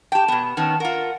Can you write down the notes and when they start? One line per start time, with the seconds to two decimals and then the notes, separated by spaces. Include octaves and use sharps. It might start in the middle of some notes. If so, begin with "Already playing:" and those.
0.12 G4 G5 A5
0.28 B2 B3
0.57 D#3 B3 C#4 A5
0.80 F4 A#4 F#5